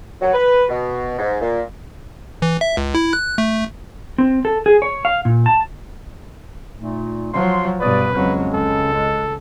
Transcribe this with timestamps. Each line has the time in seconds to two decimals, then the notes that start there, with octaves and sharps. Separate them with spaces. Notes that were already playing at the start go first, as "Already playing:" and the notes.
0.21 F#3
0.33 B4
0.69 B2
1.19 G#2
1.41 A#2
2.42 E3
2.61 E5
2.77 C#2
2.95 E4
3.13 F#6
3.38 A3
4.18 C4
4.45 A4
4.66 G#4
4.82 C#5
5.05 F5
5.25 A#2
5.46 A5
6.79 A#2 A3 D#4
7.33 F3 F#3 C6
7.80 G2 B2 B4 D5 D#6
8.14 F2 C#3 F#3 G#3 C#4
8.54 C#2 A4
8.93 G#3